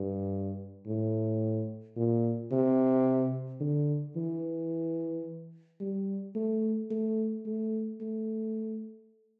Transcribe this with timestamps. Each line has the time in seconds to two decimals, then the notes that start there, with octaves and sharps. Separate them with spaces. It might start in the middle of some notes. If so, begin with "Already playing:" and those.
Already playing: G2
0.86 A2
1.96 A#2
2.51 C3
3.60 D3
4.16 E3
5.80 G3
6.36 A3
6.91 A3
7.46 A3
8.01 A3